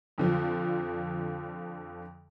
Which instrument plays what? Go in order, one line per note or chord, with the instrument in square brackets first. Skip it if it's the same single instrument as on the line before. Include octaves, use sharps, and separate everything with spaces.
[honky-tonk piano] F2 D3 F3